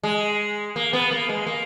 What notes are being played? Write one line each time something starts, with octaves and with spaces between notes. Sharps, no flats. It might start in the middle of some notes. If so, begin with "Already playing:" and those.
G#3
A#3
B3
A#3
G#3
A#3